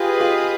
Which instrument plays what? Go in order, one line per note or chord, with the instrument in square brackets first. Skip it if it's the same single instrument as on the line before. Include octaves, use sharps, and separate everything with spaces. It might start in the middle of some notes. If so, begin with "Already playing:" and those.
Already playing: [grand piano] F4 G4 [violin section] G#4 B4 D#5
[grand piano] F4 G4